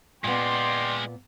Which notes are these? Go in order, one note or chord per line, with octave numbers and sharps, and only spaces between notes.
A#2 G#3 B3 F4 D5 G5 C6